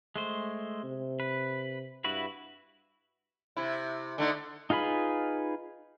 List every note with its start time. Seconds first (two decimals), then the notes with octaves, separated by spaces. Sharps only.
0.16 G#3 A3 C5
0.84 C3
1.20 B4
2.04 G2 E4 F#4 B4
3.57 C3 E4
4.18 D3 A3 D#4
4.70 D#4 F4 G#4 B4 B5